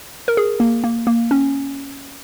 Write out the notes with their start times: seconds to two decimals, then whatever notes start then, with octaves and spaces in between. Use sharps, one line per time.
0.28 A#4
0.37 G#4
0.60 A#3
0.84 A#3
1.07 A#3
1.31 C#4